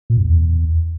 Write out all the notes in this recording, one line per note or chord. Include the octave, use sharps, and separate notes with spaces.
A#2
F#2
E2